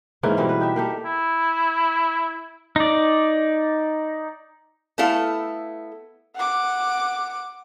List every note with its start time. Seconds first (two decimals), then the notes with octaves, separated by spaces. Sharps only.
0.23 G#2 E3 A#3 C#4
0.37 B2 G3 C4 A#4
0.49 B4
0.60 D#4 G4 E5
0.76 A#3 G4 A4
1.05 E4
2.76 D#4 D5
4.98 A3 B3 E4 A4 F5
6.35 F#5 D6